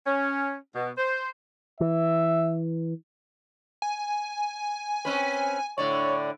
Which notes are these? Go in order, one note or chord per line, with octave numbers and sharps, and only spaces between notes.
C#4
B2
C5
E3 E5
G#5
C4 C#4 B4
A2 D3 C#5 D5